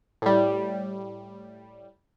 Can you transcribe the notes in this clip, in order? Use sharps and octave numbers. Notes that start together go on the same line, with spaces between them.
A2 G3